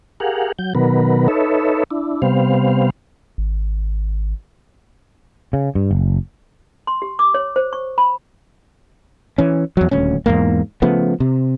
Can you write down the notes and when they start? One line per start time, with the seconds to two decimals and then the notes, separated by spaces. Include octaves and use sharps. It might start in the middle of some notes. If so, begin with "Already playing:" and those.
0.20 G4 G#4 A#4 F5 F#5
0.59 F#3 G6
0.75 B2 D#3 F#3 B3 A#4 B4
1.28 D#4 A4 B4 C#5 E5
1.91 D4 E4
2.22 C3 G3 B3 C5 F5
3.38 G#1
5.53 C#3
5.75 G2
5.91 F#1
6.87 C6
7.02 G4
7.19 D6
7.34 C#5
7.56 C5
7.73 C#6
7.98 B5
9.38 E3 C#4
9.77 E2 F#3
9.91 D#1 D2 C#4
10.26 E2 G#2 A#3
10.82 C#3 F3 A3 B3
11.20 C3